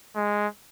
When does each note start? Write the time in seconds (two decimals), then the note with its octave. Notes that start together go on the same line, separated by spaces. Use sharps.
0.16 G#3